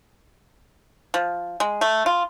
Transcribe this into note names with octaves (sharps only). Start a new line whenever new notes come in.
F3
G#3
A3
F4